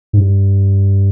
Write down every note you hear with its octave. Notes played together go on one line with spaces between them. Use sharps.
G#2
G2